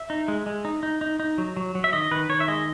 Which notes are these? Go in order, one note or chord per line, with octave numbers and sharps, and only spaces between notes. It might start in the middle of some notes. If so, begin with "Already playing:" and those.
Already playing: E5
D#4
G#3
G#3
D#4
D#4
D#4
D#4
F#3
F#3
F#3
E5
D#3 D#5
D#3 B4
D#3 C#5
E5
G#3 D#5